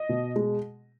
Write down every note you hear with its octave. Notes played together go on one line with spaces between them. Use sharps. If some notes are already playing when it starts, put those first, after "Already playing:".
Already playing: D#5
B2
G#3